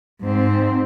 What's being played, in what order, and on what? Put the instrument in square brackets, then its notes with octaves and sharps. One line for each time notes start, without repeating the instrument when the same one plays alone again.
[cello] G#2 C4